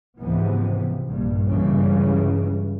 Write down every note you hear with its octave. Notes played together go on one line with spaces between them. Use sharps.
C#2 G#2 C3 E3 F3 B3
A#1 G2
C#2 G2 C#3 E3